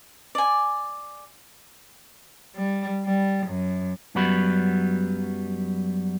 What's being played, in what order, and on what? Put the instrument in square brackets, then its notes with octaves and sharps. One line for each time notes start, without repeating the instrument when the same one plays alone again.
[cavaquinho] D5 G#5
[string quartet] G3
G3
F#2
[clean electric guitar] F#2 F#3 G3 B3 F#4 B5